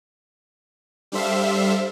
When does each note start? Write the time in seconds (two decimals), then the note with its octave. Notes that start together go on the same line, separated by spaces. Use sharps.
1.12 G3 D4 A4 C5 E5 F5